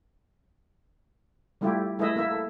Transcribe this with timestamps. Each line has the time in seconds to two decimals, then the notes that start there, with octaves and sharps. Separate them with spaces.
1.61 G3 A3 E4 F4 G4
1.99 A3 E4 G#4 B4 D#5 E5
2.16 A#3 E4 E5
2.31 A4